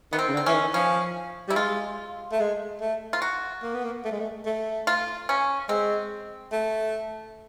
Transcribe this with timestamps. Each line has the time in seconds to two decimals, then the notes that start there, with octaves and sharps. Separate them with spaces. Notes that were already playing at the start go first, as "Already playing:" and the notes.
0.12 D#3 B3
0.19 C4
0.28 C#3
0.33 D3
0.37 C4
0.46 E3 C#4
0.53 D#3
0.74 F3 C#4
1.48 G3 E4
1.56 G#3 F4
2.32 A3
2.40 G#3
2.81 A3
3.13 F4
3.22 F#4
3.63 A#3
3.75 B3
3.84 A#3
4.05 A3
4.12 G#3
4.20 A3
4.46 A3
4.87 F4
5.29 C#4
5.69 G#3 C4
6.52 A3